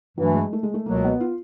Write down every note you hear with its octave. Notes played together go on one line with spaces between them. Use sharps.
G2 E3 F#3 A3
G#3
A3
G#3
A3
C#2 B2 F#3 A#3
B3
F4